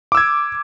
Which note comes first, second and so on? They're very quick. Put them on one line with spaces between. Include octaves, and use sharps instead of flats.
D6 E6 G#6